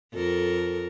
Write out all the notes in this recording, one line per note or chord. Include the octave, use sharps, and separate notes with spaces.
F2 A4 A#4